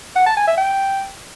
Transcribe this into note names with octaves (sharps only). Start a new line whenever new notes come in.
F#5
A5
G#5
E5
G5